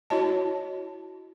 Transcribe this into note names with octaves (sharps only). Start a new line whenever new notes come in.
E4 F#4 C#5 D#5 A5